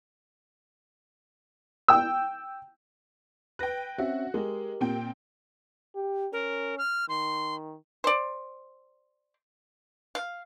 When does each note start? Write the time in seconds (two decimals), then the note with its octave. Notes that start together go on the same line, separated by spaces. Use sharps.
1.88 G5 E6
3.59 B4 G5 F#6 A#6
3.98 C4 C#4 F#4 E5
4.34 G#3 G4 A#4
4.81 A#2 C4 G5
5.95 G4
6.33 C#4 A#4
6.78 F6
7.09 D#3 C6
8.04 C5 D5
10.15 F5